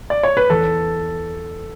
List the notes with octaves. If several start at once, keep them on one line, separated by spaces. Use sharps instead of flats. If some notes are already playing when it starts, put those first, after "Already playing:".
D5
C#5
B4
E2 A4